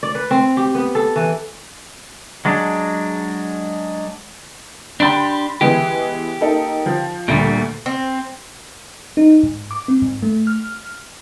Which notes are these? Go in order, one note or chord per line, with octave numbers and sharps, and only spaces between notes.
D5
B4
C4
G4
B3
A4
E3
F#3 G#3 D4
D4 G4 B5 C6 A6
E3 G#3 B3 G4
A#3 D#4 A4
F3
D2 A#2 G3
C4
D#4
G#2
D6
C4
G#2
A3
F6